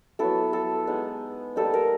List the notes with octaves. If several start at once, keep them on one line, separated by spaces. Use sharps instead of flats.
F#3 B3 E4 A4
A4
G#3 B3 D#4
G3 A#3 D#4 A4
A#4